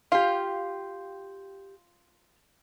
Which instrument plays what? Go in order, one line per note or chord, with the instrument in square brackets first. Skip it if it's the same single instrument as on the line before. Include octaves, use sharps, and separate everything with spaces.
[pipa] F4 [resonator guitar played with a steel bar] G4 F5